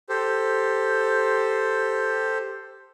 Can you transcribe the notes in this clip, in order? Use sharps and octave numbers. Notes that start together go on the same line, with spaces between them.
G4 A4 C5